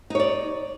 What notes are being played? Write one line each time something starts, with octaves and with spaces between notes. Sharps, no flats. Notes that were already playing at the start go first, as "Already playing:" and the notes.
D#4 C#5 D5